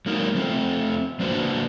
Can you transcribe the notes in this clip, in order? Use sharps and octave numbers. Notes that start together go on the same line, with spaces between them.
F#3 G#3 A#3 D#4 A#4
F3 A3 C4
F3 A#3 D4 F#4 B4 C5